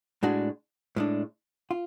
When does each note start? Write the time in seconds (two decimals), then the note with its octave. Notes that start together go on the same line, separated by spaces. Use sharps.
0.23 A2 G#3 D4 F#4
0.96 A2 G#3 D4
1.71 F4